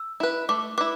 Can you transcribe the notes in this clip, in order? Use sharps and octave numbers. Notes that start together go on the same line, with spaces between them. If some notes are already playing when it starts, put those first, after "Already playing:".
Already playing: E6
E4 B4
A3 D6
E4 B4 D6